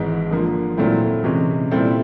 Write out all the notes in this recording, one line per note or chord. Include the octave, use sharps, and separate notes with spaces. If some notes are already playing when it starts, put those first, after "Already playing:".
Already playing: G#1 G#2 E3 G#3
D3 F3 A#3
A#2 F#3 A3 C4 E4
C3 E3 G#3 C#4
A#2 G3 C4 E4 A4